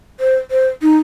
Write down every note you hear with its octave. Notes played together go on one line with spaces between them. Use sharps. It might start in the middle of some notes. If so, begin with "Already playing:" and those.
C5
C5
D#4